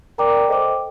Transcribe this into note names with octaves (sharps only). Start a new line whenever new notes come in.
A#4 D5 G5 A#5 D6
A4 C5 D#5 G5 D6